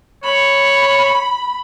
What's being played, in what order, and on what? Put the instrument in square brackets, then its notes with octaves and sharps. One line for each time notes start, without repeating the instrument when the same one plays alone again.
[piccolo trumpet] C#5 [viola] B5